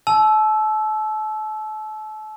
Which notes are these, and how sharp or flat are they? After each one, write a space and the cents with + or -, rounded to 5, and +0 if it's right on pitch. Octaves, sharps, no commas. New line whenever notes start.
A5 -35 E6 +0